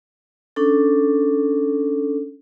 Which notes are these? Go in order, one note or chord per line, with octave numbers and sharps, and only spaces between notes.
C#4 D4 A4